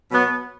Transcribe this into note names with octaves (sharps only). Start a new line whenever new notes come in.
B2 F#3 B3